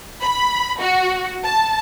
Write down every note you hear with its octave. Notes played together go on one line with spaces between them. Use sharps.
B5
F#4
A5